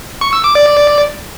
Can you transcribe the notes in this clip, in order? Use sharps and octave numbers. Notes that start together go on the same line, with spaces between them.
C#6
E6
D6
D5